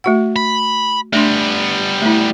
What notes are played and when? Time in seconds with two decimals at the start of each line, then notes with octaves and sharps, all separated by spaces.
0.04 A3 F#4 F#5
0.36 B5
1.13 G3 A3 B3 D4 C6
2.02 A3 E4